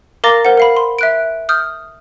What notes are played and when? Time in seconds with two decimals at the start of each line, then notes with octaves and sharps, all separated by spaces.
0.24 A#4 F5 A#5 D6 A6 A#6
0.45 A#4 C5 F#5
0.58 A#4 F5 B5
0.77 C6
0.99 E5 F#6 D7
1.49 D#6 F6 G6